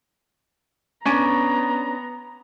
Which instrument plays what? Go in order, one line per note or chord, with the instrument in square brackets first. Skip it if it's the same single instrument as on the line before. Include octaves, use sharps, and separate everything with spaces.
[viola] B3 A#5 [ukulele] C#4 D4